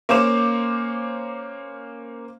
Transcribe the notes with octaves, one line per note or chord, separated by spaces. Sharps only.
A#3 C#4 C5 D6 E7